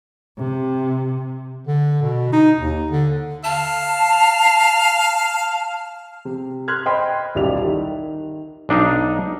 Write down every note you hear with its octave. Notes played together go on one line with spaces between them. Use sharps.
C3
D3
B2
D#4
D#2
D3
F5 A5
C3
C6 F6 F#6 G#6
C5 D#5 G5 B5 C6
D#1 B1 G3 E4 D5 F7
D#3
B1 D4 D#4 F5